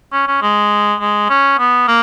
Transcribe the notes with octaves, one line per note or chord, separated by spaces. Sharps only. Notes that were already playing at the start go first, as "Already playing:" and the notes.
C#4
C#4
G#3
G#3
C#4
B3
A#3